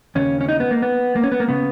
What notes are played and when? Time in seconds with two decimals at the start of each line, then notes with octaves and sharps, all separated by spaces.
0.15 D#2 C#3 C#4
0.41 C#4
0.49 D#4
0.60 B3
0.71 A#3
0.82 B3
1.16 A#3
1.24 C#4
1.32 B3
1.40 A#3
1.49 C#3 B3